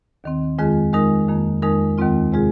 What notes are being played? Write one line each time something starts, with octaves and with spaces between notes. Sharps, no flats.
D#2 D#3 C4
F2 D#3 G#3 F4 G#4
D#3 G#3 D#4 A#4
F2 D#3 A#3
F2 D#3 G#3 D#4 A#4
D#2 D#3 G#3 C4 F4
C3 G#3 F4 G#4